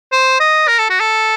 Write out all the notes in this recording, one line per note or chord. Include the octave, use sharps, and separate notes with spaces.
C5
D#5
A#4
A4
F#4
A4